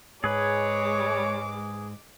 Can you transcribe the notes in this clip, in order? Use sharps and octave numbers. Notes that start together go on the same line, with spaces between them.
G#2 G#3 G#4 B4 C#5 D6